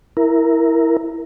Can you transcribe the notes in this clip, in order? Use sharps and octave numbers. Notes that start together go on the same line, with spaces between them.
E4 A#4